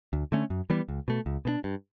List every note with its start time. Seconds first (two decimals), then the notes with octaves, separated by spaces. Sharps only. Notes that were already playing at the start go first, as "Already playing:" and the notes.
0.13 D2
0.32 D3 A3 C#4
0.50 F#2
0.70 E3 G3 B3
0.89 C#2
1.08 B2 A3
1.26 C#2
1.45 B2 A3 D4
1.64 G2